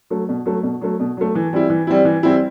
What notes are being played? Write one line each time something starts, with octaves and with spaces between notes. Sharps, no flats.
F#3 A3
B2
F#3 A3
B2
F#3 A3
B2
F#3 A3
E3
G3 C4 E4
E3
G3 C4 E4
E3
G3 C4 E4